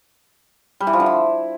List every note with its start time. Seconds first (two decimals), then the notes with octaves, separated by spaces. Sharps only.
0.80 G3
0.87 E3
0.93 F3
1.00 D3
1.06 E4